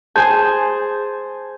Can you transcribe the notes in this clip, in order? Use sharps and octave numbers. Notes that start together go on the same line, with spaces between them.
G#4 C5 G#5 A5 G6